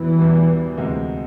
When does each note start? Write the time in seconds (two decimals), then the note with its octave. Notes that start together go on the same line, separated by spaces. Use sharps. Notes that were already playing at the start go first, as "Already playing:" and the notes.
Already playing: E2 B2 E3 G3
0.18 E2 B2 G3
0.77 D2 C3 D#3 G#3